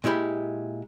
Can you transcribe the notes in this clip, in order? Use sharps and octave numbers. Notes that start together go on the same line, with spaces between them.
A#2 G#3 E4 G4 B5